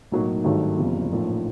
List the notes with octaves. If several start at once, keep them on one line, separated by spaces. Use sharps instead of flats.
B1 A2 F#3 A#3 D#4
G#1 G2 D#3 F#3 A3
F#1 E2 C3 F3
A#1 A2 F3 A#3 D#4